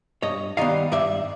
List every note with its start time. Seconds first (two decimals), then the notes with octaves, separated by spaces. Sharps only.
0.22 G2 C#5 D#5
0.57 D#3 G3 B3 D#5 F5
0.92 G2 D5 E5